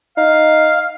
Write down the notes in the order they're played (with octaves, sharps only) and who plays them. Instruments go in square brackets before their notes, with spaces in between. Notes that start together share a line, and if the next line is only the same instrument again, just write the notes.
[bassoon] D#4 [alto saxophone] F5